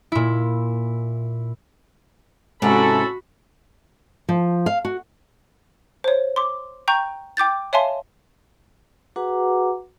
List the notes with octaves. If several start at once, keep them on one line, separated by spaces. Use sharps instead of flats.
A#2 E4
G#2 C3 C#4 E4 F#4 G4 A4 B5
F3
F5
F#4
C5 C#5
C6 D6
G5 A#5 C#6 G6
G5 D6 G6 A6
C#5 E5 F5 G#5 A5 C6
F#4 G#4 B4 F#5 A#5 D6